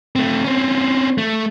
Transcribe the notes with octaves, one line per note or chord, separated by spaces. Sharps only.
A3 C4
C4 C#4
A3